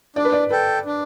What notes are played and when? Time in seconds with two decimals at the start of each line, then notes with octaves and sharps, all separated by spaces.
0.16 D4 D5
0.25 B4
0.33 D5
0.50 A4 B4 G5
0.86 D4